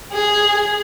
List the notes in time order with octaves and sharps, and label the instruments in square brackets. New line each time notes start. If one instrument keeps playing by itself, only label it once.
[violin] G#4